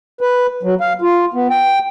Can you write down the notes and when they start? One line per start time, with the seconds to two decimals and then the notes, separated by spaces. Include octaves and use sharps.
0.21 B4
0.63 F#3
0.80 F5
1.01 F4
1.34 B3
1.50 G5